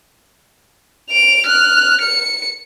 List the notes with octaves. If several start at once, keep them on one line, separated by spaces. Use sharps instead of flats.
D7 F7
F6 F#6
C#7